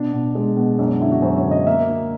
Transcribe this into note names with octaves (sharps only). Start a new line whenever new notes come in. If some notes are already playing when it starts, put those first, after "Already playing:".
Already playing: B2 D4
B2
G#3
B2
F#2 D4
D4
D3 E4
F#4
F#2 C5
C#5
D3
D#5
A#3 E5
A#3